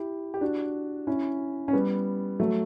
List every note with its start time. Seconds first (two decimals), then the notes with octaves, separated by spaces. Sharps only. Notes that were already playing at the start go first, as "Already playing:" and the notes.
Already playing: E4 G4
0.34 G4
0.41 D4 F#4
1.07 C#4 E4
1.68 C#4
1.73 G3 B3
2.40 F#3 A3